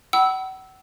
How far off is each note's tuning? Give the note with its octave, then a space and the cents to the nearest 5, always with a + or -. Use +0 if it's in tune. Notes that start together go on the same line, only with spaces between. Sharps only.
F#5 +40 B5 -15 E6 -10